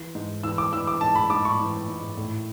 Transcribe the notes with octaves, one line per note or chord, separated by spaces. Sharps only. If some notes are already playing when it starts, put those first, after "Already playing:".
Already playing: E3
G#2
E3 E6
D6
E3 E6
D6
G#2 A5
B5
G#2 D6
C#6
E3
G#2
A2